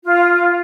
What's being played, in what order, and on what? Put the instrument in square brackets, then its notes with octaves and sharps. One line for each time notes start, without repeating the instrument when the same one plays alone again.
[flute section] F4